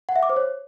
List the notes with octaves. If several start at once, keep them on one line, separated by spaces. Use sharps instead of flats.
F#5
E5
D6
C5
C#5